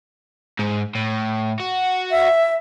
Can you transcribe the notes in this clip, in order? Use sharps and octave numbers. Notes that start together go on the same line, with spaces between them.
G#2
A2
F#4
E5